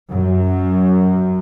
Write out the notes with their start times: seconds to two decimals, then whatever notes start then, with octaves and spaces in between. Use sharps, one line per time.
0.11 F#2